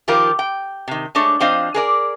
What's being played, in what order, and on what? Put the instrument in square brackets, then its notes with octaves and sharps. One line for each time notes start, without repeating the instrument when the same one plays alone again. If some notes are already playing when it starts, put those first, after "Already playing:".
[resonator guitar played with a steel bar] D#3 F3 F4 G4 A#4
G5
C3 D#3
G#3 A3 D4 C#5
F3 C4 D4 C5 D#5 F5
G#4 A#4 D5